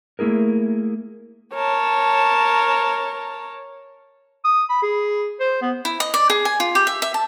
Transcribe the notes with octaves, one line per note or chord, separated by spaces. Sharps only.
A3 A#3 E4 G#4 A#4
A#4 C#5 A5
D#6
B5
G#4
C5
B3
E4
D#5
D5
G#4
G#5
F4
G4
E5
E5
A5